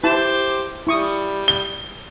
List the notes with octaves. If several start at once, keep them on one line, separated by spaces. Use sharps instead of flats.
E4 G4 C5 A5
G3 E4 C#6 D#6
G7